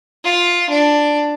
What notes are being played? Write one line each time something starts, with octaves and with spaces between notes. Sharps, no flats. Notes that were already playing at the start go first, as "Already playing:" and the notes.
F4
D4